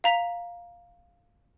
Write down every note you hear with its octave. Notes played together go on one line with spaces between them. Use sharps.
F5 A#5 B6 F7